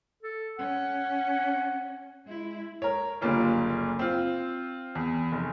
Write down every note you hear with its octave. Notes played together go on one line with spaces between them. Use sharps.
A4
C#4 F#5
G#3 E4
A#4 C#5
F#1 D2 G3 A#3 F4 C#5
C4 F4
E2
F1